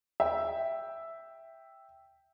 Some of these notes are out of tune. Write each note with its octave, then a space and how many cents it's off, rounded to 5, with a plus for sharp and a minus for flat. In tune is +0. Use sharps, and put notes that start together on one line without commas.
E5 +0 G5 +0